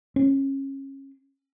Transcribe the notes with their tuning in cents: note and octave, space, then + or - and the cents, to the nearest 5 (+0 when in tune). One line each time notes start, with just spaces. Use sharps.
C#4 -25